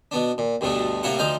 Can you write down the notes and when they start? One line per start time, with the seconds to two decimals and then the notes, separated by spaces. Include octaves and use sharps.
0.11 B2 B3 D4
0.38 A#2
0.61 D2 G2 B2 D3 A3 B3
1.03 A2 C3 A#3 E4 F4 F#5
1.19 D2 F3 D#4 C5 F5